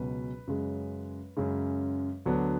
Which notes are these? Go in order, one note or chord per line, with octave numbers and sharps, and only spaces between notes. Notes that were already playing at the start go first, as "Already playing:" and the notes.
Already playing: C#2 B2 F#3 C#4 B4
F#2 C#3 G#3
F#2 C#3 G#3
D2 D3 F#3 B3 D4